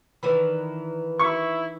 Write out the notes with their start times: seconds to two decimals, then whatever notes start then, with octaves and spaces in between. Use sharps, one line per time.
0.23 D#3 E3 D4 B4 B5
1.19 E4 C#6